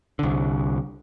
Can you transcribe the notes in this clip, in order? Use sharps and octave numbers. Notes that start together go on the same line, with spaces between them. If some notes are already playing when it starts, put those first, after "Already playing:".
C2 D3